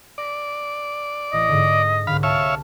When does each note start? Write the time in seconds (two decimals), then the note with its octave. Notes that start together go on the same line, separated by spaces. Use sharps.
0.18 D5 A#6 B6
1.33 A1 D#5
1.49 G#2 D3
2.07 C2 G#2 D3 F5 B5
2.23 C#5 E5 F5 A5 F6 A6